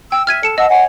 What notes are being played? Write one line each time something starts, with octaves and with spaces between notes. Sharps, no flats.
G5 E6
E5 F6 G#6 D#7
A4 C#7 E7
D#5 F#5 A5 E6
C#5 F#5 G#5